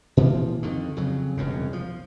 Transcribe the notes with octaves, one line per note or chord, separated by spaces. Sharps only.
A#2 E3 F3 A#3
F2 D3 D#3
F2 C#3 F#3
E1 C2 F#2 C#3
F3